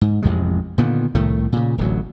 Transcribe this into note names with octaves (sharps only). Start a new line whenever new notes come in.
G#2
A1 F2 C3 G#3
A#2 D3 D#3 B3
C2 A2 D#3 A3
A#2 C#3
D1 A1 D2 F#3